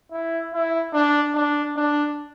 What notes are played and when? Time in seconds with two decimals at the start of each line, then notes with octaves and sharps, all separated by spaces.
0.12 E4
0.54 E4
0.94 D4
1.35 D4
1.76 D4